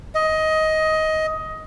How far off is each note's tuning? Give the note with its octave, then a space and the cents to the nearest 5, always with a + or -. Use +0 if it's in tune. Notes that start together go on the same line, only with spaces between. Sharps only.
D#5 +15